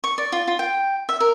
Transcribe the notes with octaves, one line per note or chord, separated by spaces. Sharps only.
C#6
D5
F4
F4
G5
E5
A#4